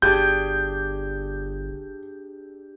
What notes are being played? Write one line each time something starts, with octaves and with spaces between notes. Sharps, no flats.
G1 D4 G4 G#4 G6